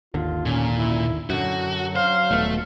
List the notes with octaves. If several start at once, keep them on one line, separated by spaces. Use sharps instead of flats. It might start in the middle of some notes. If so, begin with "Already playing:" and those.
G#1 D#2 D3 F4
A#2 C#4
E4
F#2 D3 F#3 F#4
C5 F5
D#1 B2 A3